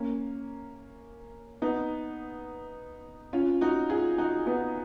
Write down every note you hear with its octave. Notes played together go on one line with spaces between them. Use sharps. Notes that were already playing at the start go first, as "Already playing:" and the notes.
Already playing: A#3 C#4
B3 D#4
C#4 F4
D#4 F#4
F4 G#4
D#4 F#4
B3 D#4